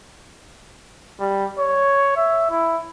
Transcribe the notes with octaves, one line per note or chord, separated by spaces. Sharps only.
G3
C#5
E5
E4